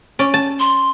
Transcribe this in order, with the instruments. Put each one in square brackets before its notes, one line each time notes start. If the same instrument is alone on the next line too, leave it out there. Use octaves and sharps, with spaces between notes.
[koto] C#4 D5
A5
[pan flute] C6